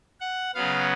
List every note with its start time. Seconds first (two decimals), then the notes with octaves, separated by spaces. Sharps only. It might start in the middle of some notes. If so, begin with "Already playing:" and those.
0.21 F#5
0.55 C#3 F#3 B3 F5